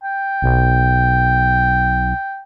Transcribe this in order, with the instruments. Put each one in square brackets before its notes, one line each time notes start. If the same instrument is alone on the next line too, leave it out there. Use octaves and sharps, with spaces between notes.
[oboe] G5
[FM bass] B1